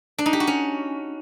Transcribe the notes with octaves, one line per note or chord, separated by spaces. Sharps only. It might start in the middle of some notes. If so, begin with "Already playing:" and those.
D4
D#4
G4
F#4
C#4